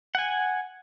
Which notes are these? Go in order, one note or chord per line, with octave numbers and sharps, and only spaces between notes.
F#5 G#5